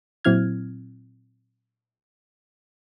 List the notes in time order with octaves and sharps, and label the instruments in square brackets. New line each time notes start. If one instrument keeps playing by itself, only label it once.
[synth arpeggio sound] A#2 F#3 C4 E4 F6 G#6